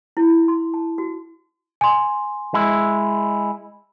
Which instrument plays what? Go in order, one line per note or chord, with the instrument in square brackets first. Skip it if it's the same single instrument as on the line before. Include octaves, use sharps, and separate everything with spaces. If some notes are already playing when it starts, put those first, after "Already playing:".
[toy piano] E4
C6
A5
F#4
[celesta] G#5 C6
[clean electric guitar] G#3 E4